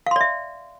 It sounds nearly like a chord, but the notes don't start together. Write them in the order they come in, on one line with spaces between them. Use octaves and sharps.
F5 C6 D5 E5